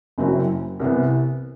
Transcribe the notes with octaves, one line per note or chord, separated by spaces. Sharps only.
F#1 F#2 F#3 C4 E4
C2 C3 E3 B3